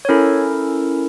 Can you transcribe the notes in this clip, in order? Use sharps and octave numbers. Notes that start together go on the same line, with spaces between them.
C#5
C#4 E4 A4 A#4